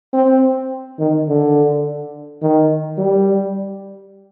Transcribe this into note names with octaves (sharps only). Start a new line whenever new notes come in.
C4
D#3
D3
D#3
G3